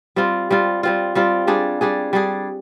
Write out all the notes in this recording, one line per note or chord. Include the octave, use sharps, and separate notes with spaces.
G3 C4 F4
G3 C4 F4
G3 C4 F4
G3 C4 F4
G3 D4 G#4
G3 D4 G#4
G3 D4 G#4